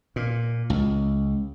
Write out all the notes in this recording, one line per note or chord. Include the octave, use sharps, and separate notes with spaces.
A#2
C#2